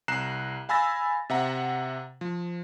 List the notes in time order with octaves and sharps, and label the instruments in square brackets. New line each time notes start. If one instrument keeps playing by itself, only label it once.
[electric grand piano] C2 A#5 F#6 C7 E7
F5 G#5 B5 E6 A6 A#6
C3 E5 F#5 A#5
F3